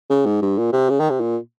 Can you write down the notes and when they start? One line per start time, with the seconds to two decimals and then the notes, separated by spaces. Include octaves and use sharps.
0.10 C#3
0.26 G#2
0.42 G2
0.58 A#2
0.73 C3
0.89 C#3
1.00 D#3
1.10 C3
1.20 A#2